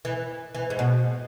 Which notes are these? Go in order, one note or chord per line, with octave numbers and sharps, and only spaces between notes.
E3
E3
G#2
B2